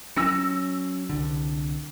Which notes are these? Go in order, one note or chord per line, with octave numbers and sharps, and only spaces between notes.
F#3 C#4 E6 A#6 C#7
C2 D3